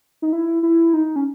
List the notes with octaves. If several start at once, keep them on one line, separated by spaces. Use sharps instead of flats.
D#4
E4
E4
D#4
C#4